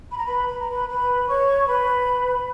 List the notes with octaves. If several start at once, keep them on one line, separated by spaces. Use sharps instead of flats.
B5
A#5
B4 B5
B5
A#5
B4 B5
B4 B5
C#5 C#6
B4 B5